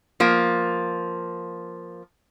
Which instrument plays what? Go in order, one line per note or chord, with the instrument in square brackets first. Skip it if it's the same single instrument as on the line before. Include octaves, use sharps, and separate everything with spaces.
[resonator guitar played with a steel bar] F3 A#3